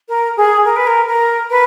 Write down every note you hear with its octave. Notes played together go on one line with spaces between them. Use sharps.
A#4
G#4
A#4
B4
A#4
A#4
B4